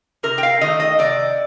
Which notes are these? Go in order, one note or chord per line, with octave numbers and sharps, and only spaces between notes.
C3 A#4
G5
F5
D#3 A3 D#5
D#5
C3 D5